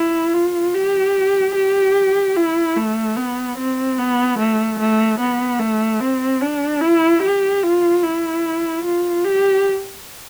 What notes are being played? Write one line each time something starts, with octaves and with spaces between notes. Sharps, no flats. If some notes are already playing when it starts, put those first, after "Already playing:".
Already playing: E4
F4
G4
G4
E4
A3
B3
C4
B3
A3
A3
B3
A3
C4
D4
E4
G4
F4
E4
F4
G4